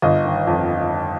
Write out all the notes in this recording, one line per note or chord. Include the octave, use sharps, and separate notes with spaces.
G1 D#5
D#3
F2